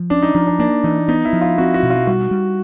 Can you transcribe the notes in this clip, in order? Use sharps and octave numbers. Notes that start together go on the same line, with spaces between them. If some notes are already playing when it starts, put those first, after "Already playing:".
Already playing: F3
C#4 D4
D#4
F3 D#4
D4
A#3 D4
E3 D#4
B3 D#4
E4
F3
F4
C4 F#4
F#4
B2
F4
G3 F#4
G3